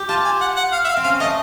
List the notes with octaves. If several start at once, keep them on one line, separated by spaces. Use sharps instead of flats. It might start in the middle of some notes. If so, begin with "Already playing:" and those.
Already playing: G4
F4 A5
G#5
F#5
F#5
F5
E5
F5
C4
C#4 F5
A3 D#5